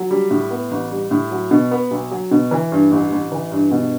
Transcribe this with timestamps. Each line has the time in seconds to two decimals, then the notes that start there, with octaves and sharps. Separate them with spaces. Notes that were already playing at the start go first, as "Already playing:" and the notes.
Already playing: F#3
0.11 G3
0.31 A2
0.51 B3
0.71 A1
0.91 G3
1.11 A2
1.31 F#3
1.51 B2
1.71 B3
1.91 B1
2.11 F#3
2.31 B2
2.51 E3
2.72 G2
2.91 A1
3.12 A1
3.32 E3
3.52 G2
3.71 B2